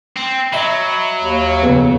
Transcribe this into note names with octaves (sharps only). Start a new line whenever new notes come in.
C4
F#3 D#5 E5 B5
D#2
F2 C#3 B3 G#4